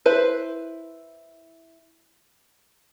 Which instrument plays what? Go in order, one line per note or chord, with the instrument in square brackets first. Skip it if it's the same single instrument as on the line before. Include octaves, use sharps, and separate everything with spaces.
[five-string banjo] E4 B4 C5